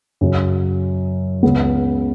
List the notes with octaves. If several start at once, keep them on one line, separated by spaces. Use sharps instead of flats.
F#2 C#3 F#3
C#2 C#3 G#3 B3